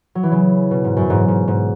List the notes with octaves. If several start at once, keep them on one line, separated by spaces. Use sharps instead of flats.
F#3
E3
C#3
B2
G#2
F#2
G#2
G#2
G#2